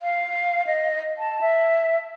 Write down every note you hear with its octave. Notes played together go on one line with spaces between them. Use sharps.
F5
D#5
A5
E5